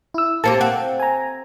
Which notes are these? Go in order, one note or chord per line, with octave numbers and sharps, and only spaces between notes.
E4 E6
A#3 C4 G4 A5 C#7
C4 F#5
G#5 A#5